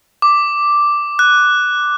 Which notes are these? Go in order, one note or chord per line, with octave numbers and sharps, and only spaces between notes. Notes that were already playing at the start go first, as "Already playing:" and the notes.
D6
F#6